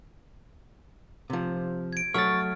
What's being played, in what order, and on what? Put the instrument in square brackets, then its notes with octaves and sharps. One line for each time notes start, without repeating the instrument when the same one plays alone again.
[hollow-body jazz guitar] C3 F3
[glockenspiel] G#6 D7
[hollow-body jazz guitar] F#3 A3 [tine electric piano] C#6 A6 [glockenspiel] F6